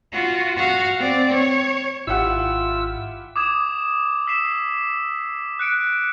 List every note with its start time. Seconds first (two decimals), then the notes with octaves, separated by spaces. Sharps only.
0.12 F4 F#4
0.56 F#4 F5
0.99 C4 D5
1.31 C#5
2.07 G#1 E4 F4 G4 F#5 E6
3.36 D6 D#6 G#6 E7
4.27 E6 B6 C7 E7
5.59 F#6 C#7 D7